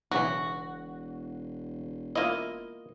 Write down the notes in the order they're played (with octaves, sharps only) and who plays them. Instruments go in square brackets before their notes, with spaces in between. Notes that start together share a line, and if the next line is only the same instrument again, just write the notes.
[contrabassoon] E1 [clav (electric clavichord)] B1 C#3 E3 [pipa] F#4
[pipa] A#3 D#5 [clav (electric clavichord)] E4 F4